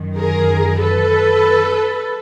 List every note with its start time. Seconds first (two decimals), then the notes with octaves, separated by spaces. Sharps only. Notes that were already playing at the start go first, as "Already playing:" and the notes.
Already playing: F#2 D#3
0.18 G#4 A#4
0.80 A4 B4